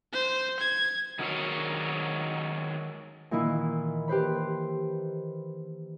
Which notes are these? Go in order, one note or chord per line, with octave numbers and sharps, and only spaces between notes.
C5
G#6
D#3 F#3 G#3 F#4 A#4 C#5
A#2 D#3 E3 E4
G4 B4 C5 B5